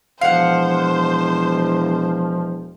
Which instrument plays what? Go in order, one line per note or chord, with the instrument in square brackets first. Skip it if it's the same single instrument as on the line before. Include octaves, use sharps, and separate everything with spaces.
[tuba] E1 [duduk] F3 [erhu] C5 [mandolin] F5 F#5